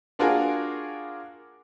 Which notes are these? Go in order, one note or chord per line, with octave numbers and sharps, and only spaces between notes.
A#3 D4 F4 F#4 G#4 A#4